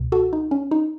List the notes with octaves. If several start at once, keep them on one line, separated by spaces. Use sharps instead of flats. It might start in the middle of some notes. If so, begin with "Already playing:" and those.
Already playing: C#2 B2
F#4 A4
D#4
C#4
D#4